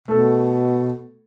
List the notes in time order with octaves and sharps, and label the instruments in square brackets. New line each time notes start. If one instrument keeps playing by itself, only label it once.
[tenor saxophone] B2 [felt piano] A3 A4